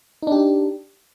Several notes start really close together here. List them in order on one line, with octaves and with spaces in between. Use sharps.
D#4 D4 G4